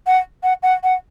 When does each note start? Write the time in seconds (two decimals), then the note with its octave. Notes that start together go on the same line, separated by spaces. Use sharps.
0.07 F#5
0.43 F#5
0.63 F#5
0.84 F#5